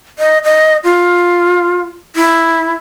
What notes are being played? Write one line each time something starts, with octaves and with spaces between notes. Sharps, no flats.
D#5
D#5
F4
E4